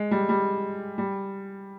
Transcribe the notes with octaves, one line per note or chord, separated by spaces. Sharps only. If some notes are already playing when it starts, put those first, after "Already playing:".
Already playing: G#3
G3
G3
G3